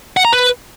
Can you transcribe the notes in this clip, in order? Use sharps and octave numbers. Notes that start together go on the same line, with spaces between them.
F#5
A#5
B4